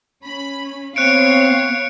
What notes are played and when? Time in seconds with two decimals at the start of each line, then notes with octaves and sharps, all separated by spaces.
0.24 C#4 B5
0.96 B3 C4 C#5 F5 F#6 C#7 D7